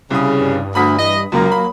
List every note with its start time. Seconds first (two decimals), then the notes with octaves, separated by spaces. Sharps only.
0.10 C2 C#3 D#6
0.41 G2
0.75 D2 B5 D#6 B6
0.98 E3 D#5
1.32 F#1 C#2 F#2 A#3
1.52 F#3 B5